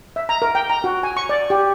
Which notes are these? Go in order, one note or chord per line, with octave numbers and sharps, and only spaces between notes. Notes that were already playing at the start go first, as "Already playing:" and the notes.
E5
A#5
A#4
G5
A#5
F#4
G#5
C#6
D5
G4